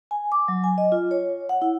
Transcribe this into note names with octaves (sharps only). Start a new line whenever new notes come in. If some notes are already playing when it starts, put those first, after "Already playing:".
G#5
D6
F#3
G#5
D#5
F4
C#5
F#5
E4